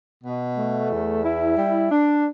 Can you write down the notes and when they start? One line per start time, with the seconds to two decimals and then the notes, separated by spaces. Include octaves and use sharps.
0.24 B2
0.57 A3
0.91 E2
1.24 E4
1.57 G3
1.91 D4